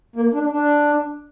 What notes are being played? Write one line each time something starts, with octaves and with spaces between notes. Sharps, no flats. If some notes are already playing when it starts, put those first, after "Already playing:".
A#3
D4
D4